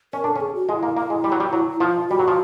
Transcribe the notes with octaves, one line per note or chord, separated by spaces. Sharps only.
C#4 A#4
D4 A4
C#4 G#4
F#4
G#3 E4
A#3
A#3 E4
G#3
G3
F#3
G3
F#3
F3 F4
G3 F#4
F#3
F3